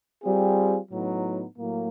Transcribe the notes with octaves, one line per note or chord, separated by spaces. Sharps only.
G3 C4 F4 G#4
A2 F#3 B3 D#4
A2 F#3 A#3